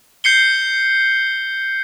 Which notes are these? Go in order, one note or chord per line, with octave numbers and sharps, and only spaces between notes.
G6 C7 C#7 G7